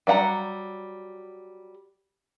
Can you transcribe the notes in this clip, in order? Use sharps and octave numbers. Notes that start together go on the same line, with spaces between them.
F#3 G3 F#5 A#5